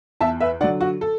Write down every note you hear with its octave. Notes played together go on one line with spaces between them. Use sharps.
E2 E5 A5
B4 E5
D3 F#3 D5 F#5
F#4
A4